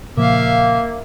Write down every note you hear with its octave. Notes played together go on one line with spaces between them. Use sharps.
A#2 C#3 F3 A#3 E5 F5